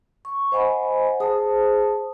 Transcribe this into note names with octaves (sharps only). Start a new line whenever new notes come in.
C#6
C5 D#5 F#5 G#5 B5
G#4 C5 A5 D#6